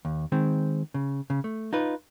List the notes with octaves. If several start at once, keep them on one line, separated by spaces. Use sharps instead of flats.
D#2
D#3 G#3 C4
C#3
C#3
A3
D#4 F4 B4